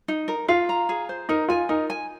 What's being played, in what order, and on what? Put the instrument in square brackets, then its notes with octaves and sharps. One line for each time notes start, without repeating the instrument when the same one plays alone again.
[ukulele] D#4
A#4
[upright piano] F4 [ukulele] F5
[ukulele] A#5
G#4
C5
[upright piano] D#4 [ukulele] A#4
[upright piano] F4 [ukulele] G#5
[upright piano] D#4 [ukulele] A#4
[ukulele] G#5